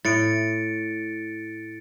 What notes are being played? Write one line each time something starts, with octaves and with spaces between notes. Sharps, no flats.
A2 A6 C#7 D7